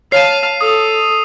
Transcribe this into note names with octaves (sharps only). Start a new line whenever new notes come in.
C#5 F5 A5 C7 D#7
A4 D#6